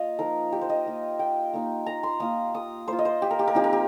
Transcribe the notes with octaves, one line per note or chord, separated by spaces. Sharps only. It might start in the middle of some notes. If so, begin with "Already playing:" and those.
Already playing: A#3 F4 D#5 F5
F3 D#4 A#4
G4
C5
D#5
A#3 F4
G5
A#3 D#4
A#5
C6
A#3 F4 D#6
D#6
A#3 F4 C5
D#5
C5
G4
A#4
G4
A#4
F3 C4 D#4 G4
A#4
G4